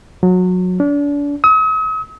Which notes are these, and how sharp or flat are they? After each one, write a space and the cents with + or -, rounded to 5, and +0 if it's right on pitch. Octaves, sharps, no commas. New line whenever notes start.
F#3 -25
D4 -35
D#6 +45